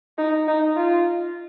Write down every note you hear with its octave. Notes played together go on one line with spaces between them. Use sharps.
D#4
D#4
F4